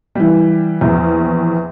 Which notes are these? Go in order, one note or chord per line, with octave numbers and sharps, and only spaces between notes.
E3 G3
A#1 E2